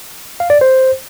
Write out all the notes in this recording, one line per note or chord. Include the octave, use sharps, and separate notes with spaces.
F5
D5
C5